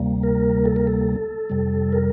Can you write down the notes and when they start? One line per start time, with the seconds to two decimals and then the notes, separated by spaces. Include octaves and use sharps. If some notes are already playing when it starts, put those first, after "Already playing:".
Already playing: D2 C3 G3 A#3
0.23 A#4
0.65 A4
0.76 A#4
0.87 A4
1.50 F2 C3 G3
1.93 A#4